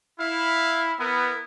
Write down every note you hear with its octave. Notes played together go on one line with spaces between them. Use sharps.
E4 F5
B3 E4 A#4